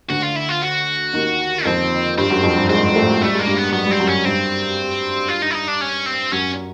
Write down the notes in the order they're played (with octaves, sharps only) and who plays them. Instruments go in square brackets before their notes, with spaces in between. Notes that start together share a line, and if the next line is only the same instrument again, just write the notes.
[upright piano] D2 D3 [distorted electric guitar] F#4
[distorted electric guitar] F4
E4
F4
F#4
[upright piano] D#2 D#3
[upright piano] F2 F3 [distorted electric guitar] C4
[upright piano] G2 G3 [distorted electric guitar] C4
[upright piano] F#2 F#3
F2 F3
G2 G3
[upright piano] G#2 G#3 [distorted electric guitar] C4
[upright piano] A2 A3
[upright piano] G3 [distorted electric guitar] A3
[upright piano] G#3 [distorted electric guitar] A#3
[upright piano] G2 G3
[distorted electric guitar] B3
[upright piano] F#3 [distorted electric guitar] B3
[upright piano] G3 [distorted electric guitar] C4
[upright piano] F#2 F#3
[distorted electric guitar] C#4
[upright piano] G2 G3 [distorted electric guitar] C4
[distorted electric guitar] F4
D#4
E4
D#4
D4
C#4
C4
[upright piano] F#2 F#3 [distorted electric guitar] C#4